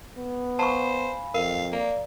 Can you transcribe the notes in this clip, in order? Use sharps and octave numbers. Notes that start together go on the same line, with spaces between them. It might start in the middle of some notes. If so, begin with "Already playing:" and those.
B3
C5 F5 G#5 A5 B5 C#6
F2 A#4 F5
A#3 D5 F5 A#5